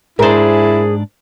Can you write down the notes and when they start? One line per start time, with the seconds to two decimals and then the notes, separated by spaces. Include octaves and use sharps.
0.19 G#2 D4 E4 G#4 A#4 C5